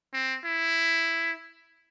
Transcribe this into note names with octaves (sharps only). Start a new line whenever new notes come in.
C4
E4